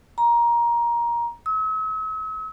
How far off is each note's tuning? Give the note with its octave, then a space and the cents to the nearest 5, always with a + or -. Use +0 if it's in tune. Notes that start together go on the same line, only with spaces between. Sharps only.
A#5 +15
E6 -45